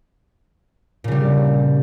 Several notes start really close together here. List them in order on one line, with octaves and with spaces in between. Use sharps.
A#2 C#3 G3